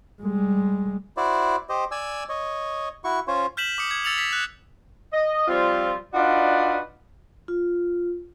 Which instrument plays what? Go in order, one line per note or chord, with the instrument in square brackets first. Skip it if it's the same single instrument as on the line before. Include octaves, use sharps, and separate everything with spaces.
[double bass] G3 G#3
[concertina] E4 F#4 C5 D5
G4 C5 D#5
D5 G#5 E6
C#5 D#5
E4 F#4 C#6
C#4 F4 C5 C#5
[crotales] F6 G6 B6 E7 F#7
D6 D#6 C#7
G#6
E6 A6 C#7 F7 F#7
B6
F#6
[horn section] D#5
F3 G3 C4 F4
D4 D#4 F4 F#4 B4 D5
[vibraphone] F4